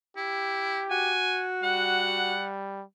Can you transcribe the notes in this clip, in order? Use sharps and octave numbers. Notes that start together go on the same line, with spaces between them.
E4 G4
F#4 G#5
G3 F#5